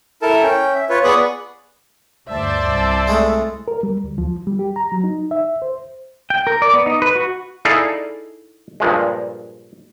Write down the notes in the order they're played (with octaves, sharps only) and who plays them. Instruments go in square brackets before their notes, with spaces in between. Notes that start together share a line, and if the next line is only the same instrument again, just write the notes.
[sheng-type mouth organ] E4 A4 A#4 A5
C#4 G5
E5
F4 B4 C#5
B3 G#4 D5 B5 C#6 D#6
[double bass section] D2 G2 [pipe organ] C5 D5 [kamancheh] E5 A5
[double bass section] C2
[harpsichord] G#3 A3 B5
[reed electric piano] A#4
G3
D2
F3
G3
G4
A#5
F#3
D#4
E5
C5
[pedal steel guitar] G5
A#4
D5
B3
D#4
B4
F#4
[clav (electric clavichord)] D#4 E4 G#4 A4 D5 F5
G2 A#2 F3 G#3